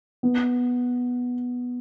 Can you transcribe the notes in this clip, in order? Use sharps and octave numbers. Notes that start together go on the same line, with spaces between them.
B3